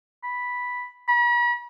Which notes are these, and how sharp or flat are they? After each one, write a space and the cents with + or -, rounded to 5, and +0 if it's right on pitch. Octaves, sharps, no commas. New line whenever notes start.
B5 -5
B5 -45